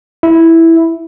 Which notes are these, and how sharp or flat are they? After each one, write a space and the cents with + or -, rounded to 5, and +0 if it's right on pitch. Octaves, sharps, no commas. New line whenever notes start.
E4 -5